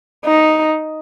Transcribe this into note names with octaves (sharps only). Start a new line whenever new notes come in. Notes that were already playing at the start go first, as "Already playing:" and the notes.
D#4